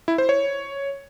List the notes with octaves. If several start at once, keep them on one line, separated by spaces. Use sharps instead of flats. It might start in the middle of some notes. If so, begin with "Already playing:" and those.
E4
C5
C#5